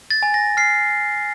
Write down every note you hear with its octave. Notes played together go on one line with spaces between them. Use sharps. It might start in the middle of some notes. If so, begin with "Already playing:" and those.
A6
G#5
A#6
F6 C7